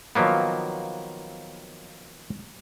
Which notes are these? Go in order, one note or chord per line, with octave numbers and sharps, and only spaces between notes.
D#3 F3 F#3 A#3 B3